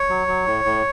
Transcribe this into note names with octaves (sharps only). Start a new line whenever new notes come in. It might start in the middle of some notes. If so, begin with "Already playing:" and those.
Already playing: C#5
F#3
F#3
A2
A2